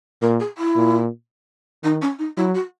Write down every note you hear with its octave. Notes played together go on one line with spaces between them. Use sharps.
A#2 A#4
G#4
E4
A#2
D#3 D#4
C#4
D#4
F#3 E4
F#4